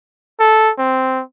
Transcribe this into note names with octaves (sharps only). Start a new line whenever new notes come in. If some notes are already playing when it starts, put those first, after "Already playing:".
A4
C4